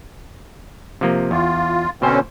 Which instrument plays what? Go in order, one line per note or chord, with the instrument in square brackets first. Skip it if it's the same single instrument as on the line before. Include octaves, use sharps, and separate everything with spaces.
[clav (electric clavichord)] C3 F3 A#3
[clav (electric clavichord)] E2 [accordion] F4
[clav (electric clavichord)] B2 C5 [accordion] D3 C4 C#4